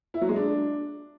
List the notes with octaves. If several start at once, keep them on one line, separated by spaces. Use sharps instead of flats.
E4
F#3
G#3
D4